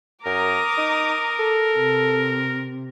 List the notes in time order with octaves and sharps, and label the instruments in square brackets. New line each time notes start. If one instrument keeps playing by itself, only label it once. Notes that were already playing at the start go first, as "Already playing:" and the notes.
[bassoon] F#2 [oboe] A#4 [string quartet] A#5 D6 D#6
[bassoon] D#4
A4
[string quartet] C3